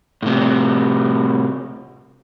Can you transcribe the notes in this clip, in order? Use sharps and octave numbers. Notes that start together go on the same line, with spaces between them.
A2 C3